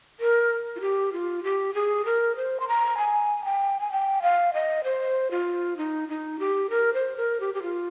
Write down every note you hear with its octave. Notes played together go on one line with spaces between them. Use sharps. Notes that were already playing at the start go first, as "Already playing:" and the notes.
A#4
F4
G4
F4
G4
G#4
A#4
C5
C6
A#5
G#5
G5
G#5
G5
F5
D#5
C5
F4
D#4
D#4
G4
A#4
C5
A#4
G4
G4
F4